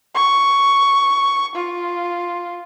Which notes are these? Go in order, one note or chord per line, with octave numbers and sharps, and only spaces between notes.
C#6
F4